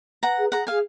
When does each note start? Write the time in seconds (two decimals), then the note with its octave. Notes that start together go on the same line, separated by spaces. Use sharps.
0.22 B4 F#5 A#5
0.38 G#4
0.52 G#4 F#5 A#5
0.67 G#4 F5 G#5